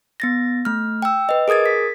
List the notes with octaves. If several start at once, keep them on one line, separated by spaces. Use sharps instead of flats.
B3 A6 A#6
A3 F6
G5 E6
B4 D#5
G#4 A#4 D#6 G#6 A6
B6